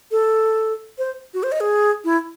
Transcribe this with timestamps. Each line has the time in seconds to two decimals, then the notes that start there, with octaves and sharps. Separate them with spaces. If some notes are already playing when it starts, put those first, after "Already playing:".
0.11 A4
0.98 C5
1.34 F#4
1.43 C5
1.52 D#5
1.60 G#4
2.04 E4